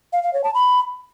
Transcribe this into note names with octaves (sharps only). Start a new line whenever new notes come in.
F5
F5
C#5
A5
B5